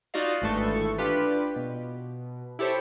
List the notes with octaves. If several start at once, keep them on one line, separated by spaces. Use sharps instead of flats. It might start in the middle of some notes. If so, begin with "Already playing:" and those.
D#4 F4 F#4 D5 D#5 F5
G#1 G2 E3 A3 A4 C#6
D4 F4 G4 B4
B2
E4 G4 A4 C5 C#5